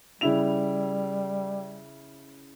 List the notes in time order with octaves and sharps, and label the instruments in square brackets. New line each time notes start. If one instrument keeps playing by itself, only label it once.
[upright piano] C#3 E4 F7 [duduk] G3